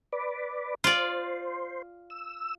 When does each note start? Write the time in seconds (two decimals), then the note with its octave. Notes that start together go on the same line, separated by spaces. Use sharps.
0.13 B4 D5
0.84 F4 C5 D5
2.10 E6